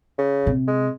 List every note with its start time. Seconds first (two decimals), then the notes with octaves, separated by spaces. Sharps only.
0.18 C#3
0.47 C3
0.67 G#3